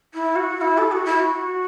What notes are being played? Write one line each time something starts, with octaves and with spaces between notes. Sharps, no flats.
E4
F#4
F#4
E4
A4
F#4
E4
F#4